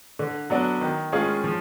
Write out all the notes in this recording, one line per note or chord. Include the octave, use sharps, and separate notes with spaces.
D3
F#3 B3 D4
D#3
G#3 C#4 F4 G#4
F3